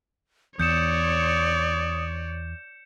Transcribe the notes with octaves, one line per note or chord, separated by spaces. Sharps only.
E2 C#5 D5 D#6 G6 C#7 E7